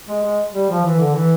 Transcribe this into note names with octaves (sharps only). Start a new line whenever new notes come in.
G#3
G#3
G3
F3
E3
D3
E3